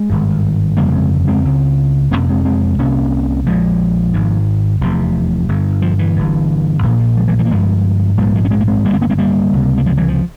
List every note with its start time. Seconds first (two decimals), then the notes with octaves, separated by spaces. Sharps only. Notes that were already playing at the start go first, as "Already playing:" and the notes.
Already playing: G#3
0.10 G#1 G2
0.77 G1 F2 C#3 G3 A#3
0.94 G#3 C4
1.27 G#3 C4
1.44 C#2 C#3
2.11 G1 F2 C3 A#3 C#4
2.29 G#3 C4
2.45 G#3 C4
2.79 C2 C3 A#3 C#4
3.47 A#1 A#2 F3 G#3
4.14 G#1 G#2
4.81 F1 E2 C3
5.49 G1 G2
5.82 F3
5.99 E3
6.16 G1 G2
6.82 A#1 A#2 E3
7.00 F3
7.17 F3 G#3
7.28 E3 G3
7.39 E3 G3
7.45 A#3
7.50 G1 G2 F3 G#3
8.17 A#1 G#2 G3 A#3
8.35 F3 G#3
8.45 C#4
8.51 G#3 C4
8.60 A#3
8.68 G#3 C4
8.84 G1 G3 A#3
8.89 G2
8.93 G#3 C4
9.01 A#3 C#4
9.10 G#3 C4
9.18 G3 A#3
9.53 C#2 C3
9.78 A#3
9.86 F3 G#3
9.97 E3 G3
10.08 F3